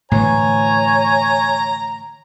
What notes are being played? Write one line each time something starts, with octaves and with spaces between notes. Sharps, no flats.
A2 D3 E3 C#5 G#5 A#5